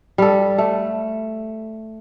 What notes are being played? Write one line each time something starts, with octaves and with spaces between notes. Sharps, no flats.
G3 A4
A3